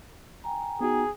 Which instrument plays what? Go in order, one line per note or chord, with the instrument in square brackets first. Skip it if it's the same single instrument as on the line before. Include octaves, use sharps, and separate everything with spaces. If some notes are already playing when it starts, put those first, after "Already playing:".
[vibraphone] G5 G#5 A#5
[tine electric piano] B3 D#4 F#4 [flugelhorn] G#4